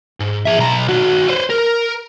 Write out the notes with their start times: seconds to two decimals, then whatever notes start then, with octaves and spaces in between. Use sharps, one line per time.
0.20 G#2
0.45 G#4 E5
0.58 B1 A#5
0.89 D#3 F#4
1.27 B4 C5
1.50 A#4